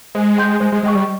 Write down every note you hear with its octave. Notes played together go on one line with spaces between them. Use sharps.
G#3 C5
G5 C6 G6
G#3 C5
G#3
G#3 D#5 G5 C#6
G3